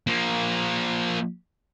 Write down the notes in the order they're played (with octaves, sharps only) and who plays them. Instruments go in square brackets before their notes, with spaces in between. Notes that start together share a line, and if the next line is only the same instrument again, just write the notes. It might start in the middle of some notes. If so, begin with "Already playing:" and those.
[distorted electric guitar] F3 A#3